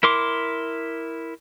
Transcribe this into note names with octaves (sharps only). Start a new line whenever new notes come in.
E4 A#4 C6 D6